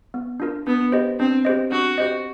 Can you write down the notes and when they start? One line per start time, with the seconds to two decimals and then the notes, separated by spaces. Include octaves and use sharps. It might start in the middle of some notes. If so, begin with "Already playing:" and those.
0.14 B3
0.40 D4 F4 A#4
0.67 B3 D4
0.92 G4 C5 D#5
1.19 C4 D4
1.45 G4 C5 D#5
1.71 D4 F#4
1.98 G4 C5 D#5